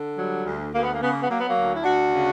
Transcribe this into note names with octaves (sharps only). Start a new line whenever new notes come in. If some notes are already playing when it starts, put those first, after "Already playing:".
Already playing: D3
F#3 G3
D2
D2 A#3
B3
A#3
C#3 B3
A#3
B3
F#3 A#3
B3
F#3 A#3
D2
E4
D2 D4 F#4
C#3